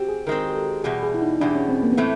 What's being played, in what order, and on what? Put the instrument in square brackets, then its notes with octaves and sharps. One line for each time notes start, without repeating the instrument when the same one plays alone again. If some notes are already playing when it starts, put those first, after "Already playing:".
Already playing: [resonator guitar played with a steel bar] C4 [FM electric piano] F#4 G4
[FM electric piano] G#4
[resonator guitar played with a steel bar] D#3 G#3 C4 [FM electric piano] A#4
[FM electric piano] A#4
A4
[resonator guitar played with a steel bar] E2 B2 G3 [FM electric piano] G#4
[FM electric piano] G#4
E4
D#4
[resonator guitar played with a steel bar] E2 B2 G3 [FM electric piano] D4
[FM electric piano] C#4
C4
A#3
B3
[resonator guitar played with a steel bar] A2 E3 A3 [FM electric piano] C4